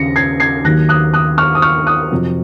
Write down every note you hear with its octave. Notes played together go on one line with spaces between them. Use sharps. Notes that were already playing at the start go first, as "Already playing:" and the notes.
Already playing: D#2 C#3 A#6 C#7
G#6 C7
G#6 C7
D#2 D#3 F#3 F#6 A#6
D#6 F#6
D#6 F#6
C#6 F6
D#6
C#6 F6
D#6 F#6
F2 C3 F#3